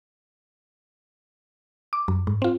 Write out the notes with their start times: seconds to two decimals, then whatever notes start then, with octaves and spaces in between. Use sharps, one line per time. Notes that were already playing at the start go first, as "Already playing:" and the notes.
1.93 D6
2.08 F#2
2.27 G#2
2.42 C4 F4